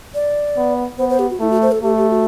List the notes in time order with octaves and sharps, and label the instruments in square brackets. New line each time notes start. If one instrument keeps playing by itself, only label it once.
[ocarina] D5
[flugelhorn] B3
[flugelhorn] B3 [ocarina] C5
[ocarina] C5
G4
F#4
[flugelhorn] A3 [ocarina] E4
[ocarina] F#4
C5
A4
[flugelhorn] A3 [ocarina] G4
[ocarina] G4
F#4